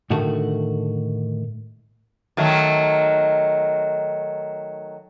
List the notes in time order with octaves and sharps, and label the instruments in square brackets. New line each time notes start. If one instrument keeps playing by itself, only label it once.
[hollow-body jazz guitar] A2 D3 D#3 A3 F#4
[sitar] D#3 F#3 A3